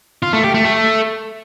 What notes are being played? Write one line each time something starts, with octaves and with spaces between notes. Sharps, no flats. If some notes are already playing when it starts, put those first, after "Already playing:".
F4
A3
G4
A3
A3